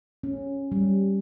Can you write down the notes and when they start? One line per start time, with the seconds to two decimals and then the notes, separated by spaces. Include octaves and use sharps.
0.24 C#4
0.72 G3